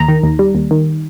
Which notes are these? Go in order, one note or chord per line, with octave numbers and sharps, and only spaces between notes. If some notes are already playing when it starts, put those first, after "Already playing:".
Already playing: D#2 A#5
D#3
D#2
G3
D#2
D#3